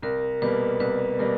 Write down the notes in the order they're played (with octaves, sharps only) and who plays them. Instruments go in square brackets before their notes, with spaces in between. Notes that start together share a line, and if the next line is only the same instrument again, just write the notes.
[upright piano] C2 [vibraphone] A#4
[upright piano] B2 G3 A#3 [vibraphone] B4
[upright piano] C2 [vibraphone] B4
[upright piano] B2 G3 A#3 [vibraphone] A#4